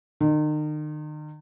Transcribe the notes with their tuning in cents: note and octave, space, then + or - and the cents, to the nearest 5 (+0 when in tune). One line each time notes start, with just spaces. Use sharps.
D#3 -40